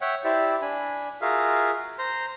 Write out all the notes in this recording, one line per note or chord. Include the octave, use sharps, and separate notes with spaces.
C#5 E5 F#5 G5
E4 G4 C5 D5 E5
D4 G#5 B5
F4 F#4 G#4 A#4 E5 F5
C5 A#5 C6